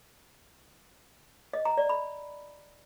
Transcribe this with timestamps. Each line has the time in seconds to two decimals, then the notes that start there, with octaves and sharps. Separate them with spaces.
1.53 D#5
1.65 A#5
1.77 D5
1.89 B5